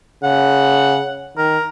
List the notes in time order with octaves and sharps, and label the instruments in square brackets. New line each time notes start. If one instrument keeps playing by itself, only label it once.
[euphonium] C#3 [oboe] F#5
[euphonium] D#3 [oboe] A#4